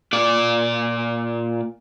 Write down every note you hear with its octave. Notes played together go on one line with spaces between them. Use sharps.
A#2 D5